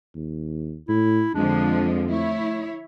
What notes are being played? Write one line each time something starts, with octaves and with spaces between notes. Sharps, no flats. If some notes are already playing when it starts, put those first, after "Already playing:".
D#2
A2 E4
F2 D3 F3 G#3 D4
A3 E4 C#5